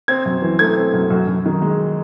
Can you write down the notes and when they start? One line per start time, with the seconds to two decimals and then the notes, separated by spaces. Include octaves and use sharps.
0.08 C4 G#6
0.26 F#2
0.42 E3
0.59 A3 G#6
0.77 C4
0.94 F#2
1.10 F#2
1.28 F#2
1.46 D#3
1.62 G#3